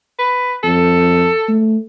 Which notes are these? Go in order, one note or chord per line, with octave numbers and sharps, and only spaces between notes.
B4
F2 A4
A3